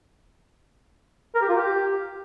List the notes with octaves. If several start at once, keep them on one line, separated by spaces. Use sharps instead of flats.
A#4
G4
F4
G4